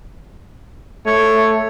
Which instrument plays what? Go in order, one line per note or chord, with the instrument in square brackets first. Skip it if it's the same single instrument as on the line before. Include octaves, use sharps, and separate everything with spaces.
[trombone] A3 [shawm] C#5